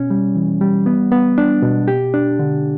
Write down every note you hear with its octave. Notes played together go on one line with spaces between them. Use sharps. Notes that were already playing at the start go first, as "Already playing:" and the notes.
Already playing: B2 C#4
G3
E3
G3
B3
B3
D4
B2
G4
D4
D3